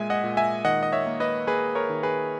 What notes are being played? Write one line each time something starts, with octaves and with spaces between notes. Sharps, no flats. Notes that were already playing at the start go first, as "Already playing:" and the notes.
Already playing: A#2 G#3 E5 G#5
D#5 F#5
A#2
E5 G#5
D#3 D#5 F#5
D#5
C#5 E5
A#3
B4 D#5
A#3 G#4 B4
A#4 C#5
D#3
G#4 B4